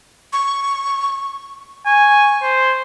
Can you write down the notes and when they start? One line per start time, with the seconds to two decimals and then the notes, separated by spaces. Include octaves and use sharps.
0.33 C#6
1.86 G#5 C#6
2.42 C5